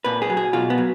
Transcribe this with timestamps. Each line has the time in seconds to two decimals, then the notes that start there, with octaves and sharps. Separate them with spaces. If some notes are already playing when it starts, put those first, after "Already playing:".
0.04 A#2 B4
0.22 G#4
0.30 F#3
0.37 G#4
0.53 B2 F4
0.70 B3
0.78 F#3